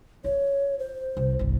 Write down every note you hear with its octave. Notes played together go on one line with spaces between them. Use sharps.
F4 C#5
C5
C2
G1 C2